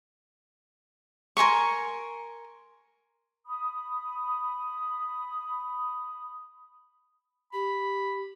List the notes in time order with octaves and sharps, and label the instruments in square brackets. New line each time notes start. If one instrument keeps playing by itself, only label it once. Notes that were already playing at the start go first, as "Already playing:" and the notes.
[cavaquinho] A#4 G#5 C6 C#6
[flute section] B5 D#6
[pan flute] G4 [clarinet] B5